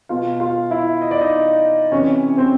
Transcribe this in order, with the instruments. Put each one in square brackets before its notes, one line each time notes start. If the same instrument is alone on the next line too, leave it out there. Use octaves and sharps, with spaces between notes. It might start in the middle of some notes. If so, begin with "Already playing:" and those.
[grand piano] B2 F4 F5
F4 F5
E4 E5
D#5
D5
D#4 D#5
C3 E3 C#4 C#5
C4 C5